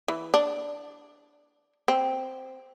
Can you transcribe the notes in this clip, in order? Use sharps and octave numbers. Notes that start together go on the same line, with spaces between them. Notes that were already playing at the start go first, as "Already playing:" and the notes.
E3
D4
C4